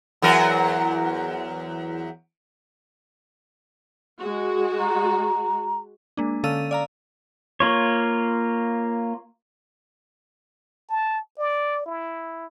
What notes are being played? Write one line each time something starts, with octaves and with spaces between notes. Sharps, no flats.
E2 F#3 A#4
G#3 F#4
A#5
G#3 A#3 D4
D3 C#4 A4 F5 E6 D#7
D5 F5 A#5
A#3 F4 C#5
A5
D5
E4